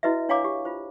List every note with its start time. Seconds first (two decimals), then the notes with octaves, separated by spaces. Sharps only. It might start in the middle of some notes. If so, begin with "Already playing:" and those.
0.03 E4 F#4 B4 D#5 E5
0.29 D4 C#5 F5 G#5 A#5 D6
0.44 G4
0.65 F4 C5